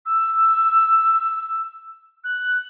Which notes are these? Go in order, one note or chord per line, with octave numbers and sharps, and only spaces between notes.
E6
F#6